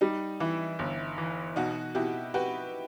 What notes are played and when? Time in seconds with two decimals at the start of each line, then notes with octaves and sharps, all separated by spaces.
0.01 G3 D#4
0.40 E3 E4
0.79 G1
1.18 E3
1.56 B2 D#4 F#4
1.95 B2 E4 G4
2.34 F#4 G4 B4